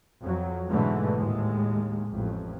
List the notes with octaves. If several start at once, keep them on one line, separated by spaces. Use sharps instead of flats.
F2 F#3
G#2 B2 D3 E3 G#3 A3
D#2 A2 G#3
A1 F2